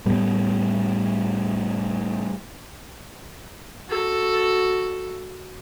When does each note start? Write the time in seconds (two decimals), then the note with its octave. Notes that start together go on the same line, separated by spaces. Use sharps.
0.06 A2 G3 B3
3.87 F#4 A4